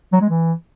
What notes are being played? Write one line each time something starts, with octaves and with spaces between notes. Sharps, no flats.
F#3
G#3
E3